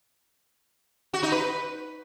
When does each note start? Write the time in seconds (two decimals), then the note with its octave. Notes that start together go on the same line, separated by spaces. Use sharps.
1.13 F#4
1.23 D#4
1.32 B4